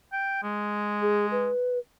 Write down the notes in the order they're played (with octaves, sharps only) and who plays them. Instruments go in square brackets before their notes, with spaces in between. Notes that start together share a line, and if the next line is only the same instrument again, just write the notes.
[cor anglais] G5
G#3
[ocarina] G#4
B4